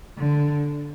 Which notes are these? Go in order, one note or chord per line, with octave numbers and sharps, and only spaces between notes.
D3